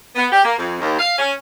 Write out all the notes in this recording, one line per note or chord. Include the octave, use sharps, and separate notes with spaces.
B3
G4
A#3
F2
D#2
F5
C#4